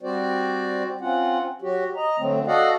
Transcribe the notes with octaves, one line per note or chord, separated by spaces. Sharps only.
G3 C4 F#4 C5 D5
C4 C#4 F4 F#5
F#3 F#4 G4
D#5 A#5
D3 F#3 A3 C4
F#4 A4 D5 D#5 F5 F#5